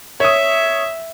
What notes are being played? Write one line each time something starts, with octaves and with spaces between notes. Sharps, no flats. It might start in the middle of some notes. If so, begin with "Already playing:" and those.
C#5 E5 D#6